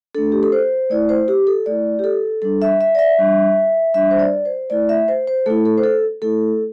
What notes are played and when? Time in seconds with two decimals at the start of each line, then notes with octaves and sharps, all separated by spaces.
0.15 A3 D4 A4
0.32 G4
0.43 A4
0.52 C5
0.90 A3 E4 D5
1.09 C5
1.28 G4
1.47 A4
1.66 A3 E4 D5
1.99 G4
2.04 A4
2.42 G3 D4 A4
2.62 E5
2.81 E5
2.95 D5
2.99 E5
3.19 G3 D4
3.94 G3 D4 E5
4.11 C5
4.19 D5
4.45 C5
4.70 A3 E4 D5
4.89 E5
5.08 C5
5.27 C5
5.46 A3 E4 A4
5.65 A4
5.77 C5
5.84 A4
6.22 A3 E4 A4